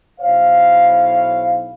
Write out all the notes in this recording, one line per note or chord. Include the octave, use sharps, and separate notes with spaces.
B1 E4 C5 C#5 F5